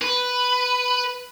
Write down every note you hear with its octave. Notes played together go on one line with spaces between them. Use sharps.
B4